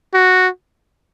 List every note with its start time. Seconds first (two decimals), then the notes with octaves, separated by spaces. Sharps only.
0.14 F#4